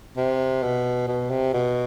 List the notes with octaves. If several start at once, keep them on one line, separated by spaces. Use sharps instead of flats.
C3
B2
B2
C3
B2